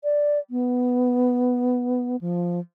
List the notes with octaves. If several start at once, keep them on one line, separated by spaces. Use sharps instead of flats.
D5
B3
F3